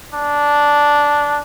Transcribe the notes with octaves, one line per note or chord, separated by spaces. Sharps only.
D4